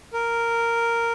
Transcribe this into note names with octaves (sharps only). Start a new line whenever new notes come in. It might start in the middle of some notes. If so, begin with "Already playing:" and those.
A#4